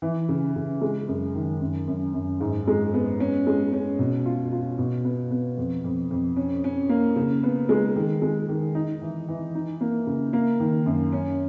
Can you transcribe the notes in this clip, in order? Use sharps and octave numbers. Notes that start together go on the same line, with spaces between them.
E3
C#3
C#3
G#3
F#2
D#3
F#2
F#2
F#2
G#2
G#3
B3
C#4
G#3
C#4
B2
F4
F4
B2
B3
B3
F2
F2
F2
C#4
C#4
A#3
C#3
B3
G#3
D#3
G#3
D#3
D#4
E3
E3
D#4
A#3
C#3
A#3
D#3
F#2
C#4